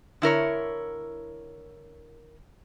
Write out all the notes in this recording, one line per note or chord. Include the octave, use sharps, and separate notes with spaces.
D3 E4 A#4 C#5